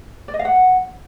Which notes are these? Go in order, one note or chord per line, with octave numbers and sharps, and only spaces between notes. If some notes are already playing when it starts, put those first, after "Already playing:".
D5
D#5
F5
F#5